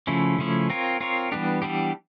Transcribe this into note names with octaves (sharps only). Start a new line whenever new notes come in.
C#3 F3 A3 C#4 E4
C#3 F3 A3 C#4 E4
C4 F4 A#4 C#5
C4 F4 A#4 C#5
E3 G3 B3 D4 G4
E3 G3 B3 D4 G4